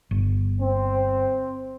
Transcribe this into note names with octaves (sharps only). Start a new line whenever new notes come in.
G1
C4